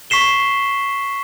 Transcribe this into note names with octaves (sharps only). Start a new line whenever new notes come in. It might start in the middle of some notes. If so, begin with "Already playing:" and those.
C#6 B6 C7 E7 G7